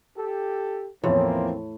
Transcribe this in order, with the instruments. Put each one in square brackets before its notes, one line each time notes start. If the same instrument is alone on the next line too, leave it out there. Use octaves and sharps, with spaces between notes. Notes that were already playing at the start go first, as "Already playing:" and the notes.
[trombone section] G4 A4
[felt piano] E2 E3 F3 [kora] A2 [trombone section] A#3 C4